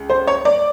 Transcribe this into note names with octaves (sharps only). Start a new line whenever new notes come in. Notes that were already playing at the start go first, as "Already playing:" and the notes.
Already playing: C#2
C5
C#5
D5